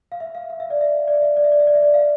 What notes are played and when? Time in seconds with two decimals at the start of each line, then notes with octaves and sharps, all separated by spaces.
0.12 F5
0.20 E5
0.35 F5
0.50 F5
0.60 E5
0.70 D5
0.81 E5
1.08 D5
1.22 E5
1.37 D5
1.44 E5
1.52 D5
1.60 E5
1.67 D5
1.75 E5
1.82 D5
1.94 F5